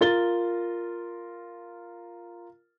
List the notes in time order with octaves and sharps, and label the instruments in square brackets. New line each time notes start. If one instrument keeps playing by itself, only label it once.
[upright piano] F4 A#4 A6 G7